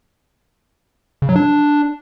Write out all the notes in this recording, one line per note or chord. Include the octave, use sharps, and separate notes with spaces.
C#3
F#3
D4